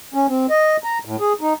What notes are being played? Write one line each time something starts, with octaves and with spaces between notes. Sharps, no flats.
C#4
C4
D#5
A#5
A2
G#4
D#4